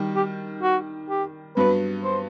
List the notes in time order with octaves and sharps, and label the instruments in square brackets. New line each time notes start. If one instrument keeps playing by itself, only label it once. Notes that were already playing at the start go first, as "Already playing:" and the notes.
Already playing: [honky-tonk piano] D#3 G3
[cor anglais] G4
F#4
G4
[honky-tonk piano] G2 F#3 B3 [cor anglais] B4
[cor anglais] C5